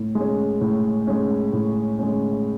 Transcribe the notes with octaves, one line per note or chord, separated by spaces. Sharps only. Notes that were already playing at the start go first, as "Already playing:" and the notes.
Already playing: A2
G#3 C#4
A2
G#3 C#4
A2
G#3 C#4